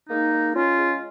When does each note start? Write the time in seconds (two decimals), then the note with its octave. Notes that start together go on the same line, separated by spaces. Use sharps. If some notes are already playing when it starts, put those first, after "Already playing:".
0.09 G#3 A#3 D#4
0.32 G#3
0.54 G#3 C#4 F4
0.77 G#3